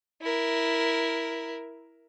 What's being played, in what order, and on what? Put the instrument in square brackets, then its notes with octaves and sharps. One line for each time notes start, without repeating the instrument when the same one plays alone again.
[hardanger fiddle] E4 A#4